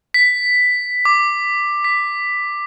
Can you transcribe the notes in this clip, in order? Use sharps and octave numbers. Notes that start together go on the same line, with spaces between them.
B6
D6
B6